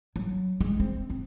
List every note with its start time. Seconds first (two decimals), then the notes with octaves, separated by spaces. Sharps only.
0.16 F#3
0.61 G#3
0.80 C4
1.10 C4